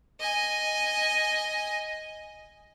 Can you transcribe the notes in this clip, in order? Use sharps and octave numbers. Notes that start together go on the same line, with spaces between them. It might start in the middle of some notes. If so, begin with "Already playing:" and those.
D#5 G#5